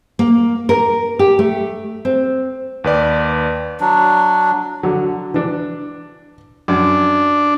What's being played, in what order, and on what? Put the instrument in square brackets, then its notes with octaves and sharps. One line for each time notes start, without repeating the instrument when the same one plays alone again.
[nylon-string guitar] A#3
A#4
G4
A3
C4
[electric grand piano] D#2 B4 D5
[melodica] F#3 D4
[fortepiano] D3 F#3
E3 D4
[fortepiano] F#2 [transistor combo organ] D4